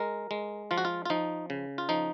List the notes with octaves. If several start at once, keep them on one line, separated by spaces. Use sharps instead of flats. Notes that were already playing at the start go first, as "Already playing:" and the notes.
Already playing: G#3 A#4
G#3
F3 F4
F#4
F4
F4
F3 D#4
C#3
F4
F3 D#4